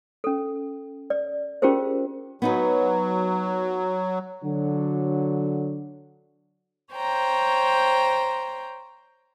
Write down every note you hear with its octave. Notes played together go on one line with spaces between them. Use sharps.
C#4 A4
D5
C#4 F4 G4 G#4 A#4 C5
F#3 B3 D#4 B4
D3 F#3
C5 C#5 G5 A#5